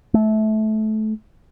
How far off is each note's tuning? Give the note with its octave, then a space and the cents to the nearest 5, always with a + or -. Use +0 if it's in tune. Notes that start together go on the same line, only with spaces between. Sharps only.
A3 -20